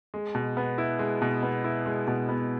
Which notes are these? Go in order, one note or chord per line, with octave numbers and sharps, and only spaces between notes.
G#3
B2
B3
E4
G#3
B2
B3
E4
G#3
B2
B3